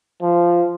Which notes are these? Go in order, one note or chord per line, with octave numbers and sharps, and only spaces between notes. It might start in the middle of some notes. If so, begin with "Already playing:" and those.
F3